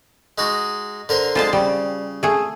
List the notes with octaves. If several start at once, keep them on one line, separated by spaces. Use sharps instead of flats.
G#3 D#4 F#4
D3 A#4 C5
D3 G#3 F4 C5 A5
C#3 G3
A3 G#4